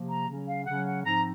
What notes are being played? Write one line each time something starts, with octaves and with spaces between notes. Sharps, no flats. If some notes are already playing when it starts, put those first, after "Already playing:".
Already playing: C3 F3 A#3
A#5
C#3 F#3 C#4
F5
C#3 F#3 C#4 F#5
F#5
G#2 F3 C4 D#4 A#5